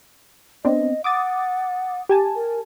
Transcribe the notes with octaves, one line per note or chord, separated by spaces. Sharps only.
B3 C4 D4 D#5
F#5 D6 D#6 A6
G4 G#5 A5
A#4